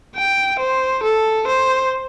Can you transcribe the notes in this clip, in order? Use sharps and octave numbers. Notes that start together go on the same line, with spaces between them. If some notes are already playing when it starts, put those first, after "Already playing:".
G5
C5
A4
C5